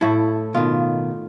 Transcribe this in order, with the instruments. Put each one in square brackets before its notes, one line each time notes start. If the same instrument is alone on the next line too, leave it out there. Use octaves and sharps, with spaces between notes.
[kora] A2 A4 [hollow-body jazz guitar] E4
[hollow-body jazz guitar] B2 D#3 [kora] F4